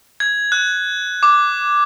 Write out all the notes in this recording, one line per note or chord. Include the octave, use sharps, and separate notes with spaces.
G#6
F#6
D6